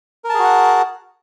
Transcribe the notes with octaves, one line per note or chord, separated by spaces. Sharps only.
F#4 G#4 A#4 F#5 A5